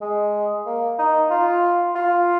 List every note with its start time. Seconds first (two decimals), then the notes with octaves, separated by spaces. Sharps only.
0.01 G#3
0.66 A#3
0.99 D#4
1.30 F4
1.95 F4